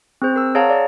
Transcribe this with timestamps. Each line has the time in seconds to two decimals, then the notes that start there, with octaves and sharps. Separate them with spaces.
0.22 C4 G#4 C5
0.36 A#4 E6
0.55 G#4 C#5 F5 F#5 A5 A#5
0.70 D5